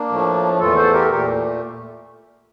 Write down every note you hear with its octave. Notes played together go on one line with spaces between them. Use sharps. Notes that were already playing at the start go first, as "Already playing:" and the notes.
Already playing: A#3 D4
A2 F3 A3
E2 E3 A3 F4 A4
A4 C5
G4 A#4
A4
A#2 A3 G4 A#4